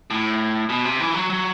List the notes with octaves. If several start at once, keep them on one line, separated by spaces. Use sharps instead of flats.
A2
B2
C3
E3
F#3
F#3